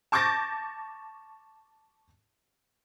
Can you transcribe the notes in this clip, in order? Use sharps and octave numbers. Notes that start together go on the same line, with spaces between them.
A5 C#6 D6 G6 A6 A#6